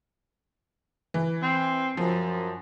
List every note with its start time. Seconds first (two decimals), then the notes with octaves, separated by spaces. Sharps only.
1.14 E3
1.42 C4
1.97 F#2 F3